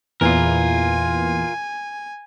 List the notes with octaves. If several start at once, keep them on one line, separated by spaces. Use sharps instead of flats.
E2 A#2 E3 F4 A#4 G#5